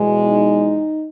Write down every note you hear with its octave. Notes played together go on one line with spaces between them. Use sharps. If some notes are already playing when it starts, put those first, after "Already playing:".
Already playing: E2 B2 G#3
D#4